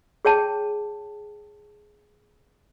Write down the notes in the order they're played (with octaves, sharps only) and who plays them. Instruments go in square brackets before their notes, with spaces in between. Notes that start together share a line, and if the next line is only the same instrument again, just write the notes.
[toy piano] G#4 C#5 G5 A5